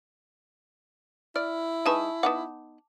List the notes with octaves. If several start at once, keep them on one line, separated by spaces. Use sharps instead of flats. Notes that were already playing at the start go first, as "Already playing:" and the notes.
E4 D5 F6
G#3 D#4 B4 G#5 A5 C#6
B3 D#4 F#5 A5 D6